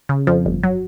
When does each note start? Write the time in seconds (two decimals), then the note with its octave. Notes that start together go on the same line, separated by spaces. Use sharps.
0.09 C#3
0.27 F2 F3
0.46 G1
0.63 F#3